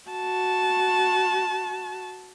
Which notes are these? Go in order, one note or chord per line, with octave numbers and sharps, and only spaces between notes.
F#4 A5